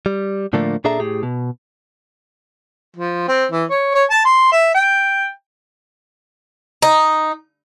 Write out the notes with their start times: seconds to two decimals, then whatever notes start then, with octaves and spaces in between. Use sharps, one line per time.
0.06 G3
0.53 A2 D3 F3 A3 A#3 D4
0.84 A#2 D4 G#4 A4 E5 A#5
1.00 A2 G4 G#4
1.23 B2
2.96 F3
3.29 C4
3.52 E3
3.70 C#5
3.95 C#5
4.10 A5
4.25 C6
4.52 E5
4.75 G5
6.82 D#4